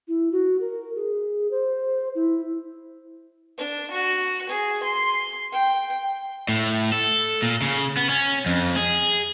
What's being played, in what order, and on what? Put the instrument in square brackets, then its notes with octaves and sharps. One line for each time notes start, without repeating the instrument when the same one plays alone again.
[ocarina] E4
F#4
A#4
G#4
C5
E4
[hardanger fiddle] D4
F#4
G#4
C6
G5
[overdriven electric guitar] A2
A4
A#2
C#3
B3
C#4
F2
G#4